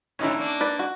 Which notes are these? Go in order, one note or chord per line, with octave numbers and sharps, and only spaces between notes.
A2 D3 F#3 C#4 D#4 E4
A#3 D4
B4 D5
F#4